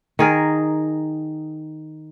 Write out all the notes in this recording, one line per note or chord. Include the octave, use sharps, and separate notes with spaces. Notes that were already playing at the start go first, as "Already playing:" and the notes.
D#3 G#4 A#4